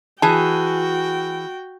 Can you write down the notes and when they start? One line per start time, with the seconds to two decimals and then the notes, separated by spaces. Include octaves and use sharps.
0.22 E3 F#4 G#4 G5 A5